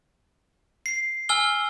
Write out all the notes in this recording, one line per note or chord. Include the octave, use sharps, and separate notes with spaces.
C7
G#5 E6 F6 G7